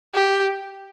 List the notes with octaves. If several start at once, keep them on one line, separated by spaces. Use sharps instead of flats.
G4